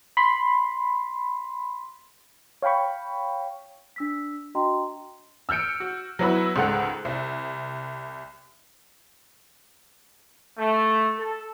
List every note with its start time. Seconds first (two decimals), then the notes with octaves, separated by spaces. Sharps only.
0.17 B5 C6
2.62 C#5 F5 G5 B5 C#6
3.96 D4 E6 B6
4.55 D4 F#4 D#5 G5 A#5 C6
5.49 E6 F6 G6 C#7 D7
5.80 F#4
6.19 F#3 B3 E4 F#4 B5
6.56 C#2 G#2 A4 F#5 F#6
7.05 C2
10.58 A3
11.18 A4